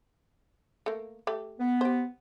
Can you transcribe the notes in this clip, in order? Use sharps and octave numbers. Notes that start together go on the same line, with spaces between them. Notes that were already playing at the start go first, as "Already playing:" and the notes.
A3 A#3
A3 G4
B3
G4 C5